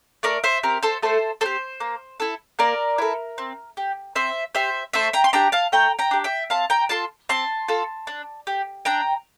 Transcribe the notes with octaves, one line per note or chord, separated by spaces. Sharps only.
A3 A#4 D5
C5 E5
C4 G4 A#4
A4 C5
A3 A4 C5
C4 G4 A4 C5
A#3
E4 A4
A#3 A#4 D5
E4 A4
C4
G4
C4 C5 E5
G4 C5 E5
A3 C5 E5
G5 A#5
C6
D4 G4 G5 A#5
F5 A5
A3 G5 A#5
G5 A#5
D4 G4
E5 G5
C4 F5 A5
G5 A#5
F4 A4 A5 C6
C4 A5 C6
F4 A4
D4
G4
D4 G5 A#5